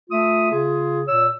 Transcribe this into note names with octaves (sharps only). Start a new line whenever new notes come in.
A3 F4 E5 D#6
C#3 F4 G#4
A#2 C#5 E6